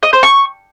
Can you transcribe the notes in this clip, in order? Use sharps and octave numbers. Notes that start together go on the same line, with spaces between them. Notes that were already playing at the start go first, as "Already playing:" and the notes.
D#5
C5
C#6